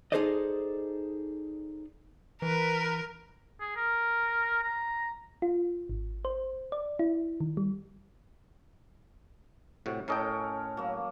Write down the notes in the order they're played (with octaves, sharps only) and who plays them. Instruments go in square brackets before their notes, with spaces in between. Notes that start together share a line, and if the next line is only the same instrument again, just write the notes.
[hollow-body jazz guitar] D#4 G#4 A4 C5 D5 D#5
[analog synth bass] E3 [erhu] A#4 [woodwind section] B4
[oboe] G#4
A#4
A#5
[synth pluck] F4
G#1
C5
D5
E4
D#3
G3
[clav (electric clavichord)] A2 C3 F#4
[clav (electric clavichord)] A2 D#5 G5 [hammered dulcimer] C#4 A4 A#4
[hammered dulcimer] F#3 A#3